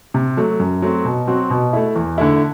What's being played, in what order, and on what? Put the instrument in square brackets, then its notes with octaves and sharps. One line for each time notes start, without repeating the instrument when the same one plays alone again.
[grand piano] C3
F#3 A3
F#2
F#3 A3 C4
B2
F#3 C4 F#4
B2
A3 E4
E2
D3 A3 E4